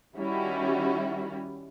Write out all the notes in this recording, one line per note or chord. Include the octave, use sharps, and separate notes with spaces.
D#3 G3 C#4 E4 F#4